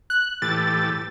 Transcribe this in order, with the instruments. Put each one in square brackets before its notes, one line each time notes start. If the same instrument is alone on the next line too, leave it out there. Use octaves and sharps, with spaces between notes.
[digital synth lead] F#6
[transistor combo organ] A2 E3 G4 [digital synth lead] A6